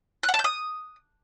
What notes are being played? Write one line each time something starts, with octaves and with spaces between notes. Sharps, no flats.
F#6
F#5
A5
G6
D#6